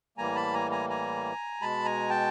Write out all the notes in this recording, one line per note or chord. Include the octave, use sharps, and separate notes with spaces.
A2 E3 G3 A#3 G#5 A#5
A5 B5
G#5 A#5
G#5 A#5
G#5 A#5
B2 G#3 A5 B5
G#5 A#5
G5 A5